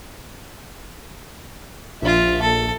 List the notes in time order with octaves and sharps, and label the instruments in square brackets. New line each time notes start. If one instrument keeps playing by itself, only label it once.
[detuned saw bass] A#1 [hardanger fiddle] F4 E5
[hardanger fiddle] A4